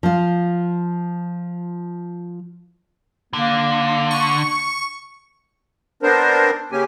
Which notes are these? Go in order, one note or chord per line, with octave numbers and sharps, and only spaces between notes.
F3 F4
D3 A#3
C#6
B3 C4 D4 A#4 C5
C#3 A#3 C#4 G4 G#5